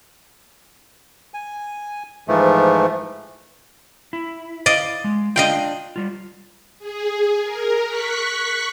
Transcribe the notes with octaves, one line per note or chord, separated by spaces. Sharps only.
G#5
G#2 E3 F3 A3
E4
D5 D#5 F5
G#3
D4 F4 D#5 F5 G5
G3 F4
G#4
A#4
C#6 F#6 B6